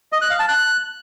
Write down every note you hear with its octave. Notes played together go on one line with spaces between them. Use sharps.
D#5
F#6
F5
A5
F#6